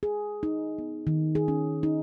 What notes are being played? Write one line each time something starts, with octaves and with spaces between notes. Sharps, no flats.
G#4
D#4
B3
D#3
G#4
C#4
D#4